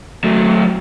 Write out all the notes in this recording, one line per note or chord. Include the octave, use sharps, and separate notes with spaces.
F#3 A3